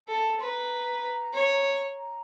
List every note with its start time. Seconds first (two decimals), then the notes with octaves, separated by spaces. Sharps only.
0.08 A4 A5
0.40 B4 A#5 C6
1.34 C#5
1.95 A#5